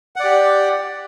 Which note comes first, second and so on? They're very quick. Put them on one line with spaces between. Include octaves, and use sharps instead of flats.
F#5 D5 G4